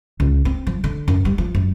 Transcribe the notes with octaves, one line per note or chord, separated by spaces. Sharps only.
C#2
C4
F3
D3
F#2
G3
F3
F#2